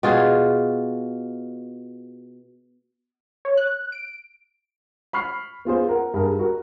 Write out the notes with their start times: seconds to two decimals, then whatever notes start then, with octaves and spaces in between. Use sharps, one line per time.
0.03 B2 F4 G#4
3.45 C#5
3.57 F#6
3.92 D7
5.13 B5 C#6 F6 C7
5.65 B3 F4 G#4 C5
5.89 A#4 F#5
6.14 G2 G#4 A#4
6.39 F#4 A#4